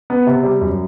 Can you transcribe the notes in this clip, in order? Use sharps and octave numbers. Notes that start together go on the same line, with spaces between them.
B3
C3
G3
F#2